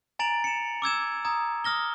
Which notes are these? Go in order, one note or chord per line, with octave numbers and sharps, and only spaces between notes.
G#5 A#5 A6 D7 F7 F#7
C#7 E7
D6 E6 G#6 E7
A#5 D#6 G#6
D#6 F6 A#6 G7